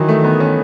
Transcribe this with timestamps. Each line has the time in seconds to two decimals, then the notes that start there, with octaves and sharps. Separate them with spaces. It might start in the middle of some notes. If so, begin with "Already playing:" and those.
Already playing: D#3 E3 F#3
0.09 A3
0.24 B3
0.40 C#4